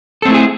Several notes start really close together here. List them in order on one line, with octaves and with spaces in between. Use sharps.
A4 C4 A3 E4 G#4